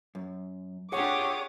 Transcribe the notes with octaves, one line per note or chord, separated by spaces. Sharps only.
F#2
D4 F4 G4 G#4 C#5 F#5 D6 D#6